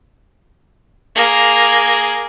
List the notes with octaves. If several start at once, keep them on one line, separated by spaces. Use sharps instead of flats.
A#3 G#4